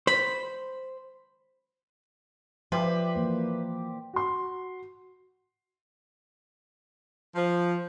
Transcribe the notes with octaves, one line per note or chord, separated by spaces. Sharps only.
C5 B5
F3 G4 B4 D5 E5 C6
E3 A#3 C5
F#4 C6
F3